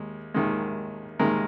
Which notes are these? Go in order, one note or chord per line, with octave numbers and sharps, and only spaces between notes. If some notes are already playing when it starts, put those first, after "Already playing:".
Already playing: D#2 G#3
D#2 D#3 G#3
D#2 D#3 G#3 A#4